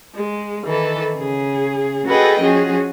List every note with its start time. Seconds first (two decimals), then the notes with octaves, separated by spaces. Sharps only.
0.14 G#3
0.66 D#3 E3 A4 B4
1.18 C#3 G#4
2.06 F#4 G#4 A4 B4 D#5 G5
2.42 F3 C#4 F#4 G#4